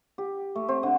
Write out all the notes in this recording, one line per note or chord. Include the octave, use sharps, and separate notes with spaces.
G4
A3
C4
D3